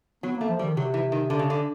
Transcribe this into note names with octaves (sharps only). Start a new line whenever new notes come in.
F#3 B3
A#3
A3
F3
G3
D#3
C3 F#3
E3
D#3
D3
C#3
D3